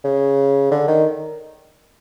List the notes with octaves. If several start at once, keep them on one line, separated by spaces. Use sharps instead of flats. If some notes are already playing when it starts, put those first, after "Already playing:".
C#3
D3
D#3